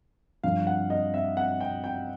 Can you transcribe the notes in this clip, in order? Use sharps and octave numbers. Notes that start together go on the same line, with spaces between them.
G2 D3 F3 F5
F#5
D#5
E5
F#5
G5
G5